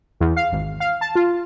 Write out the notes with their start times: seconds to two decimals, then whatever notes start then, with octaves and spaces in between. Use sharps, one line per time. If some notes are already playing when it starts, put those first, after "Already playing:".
0.20 E2
0.37 F5
0.52 G#1
0.80 F5
1.01 A5
1.15 F4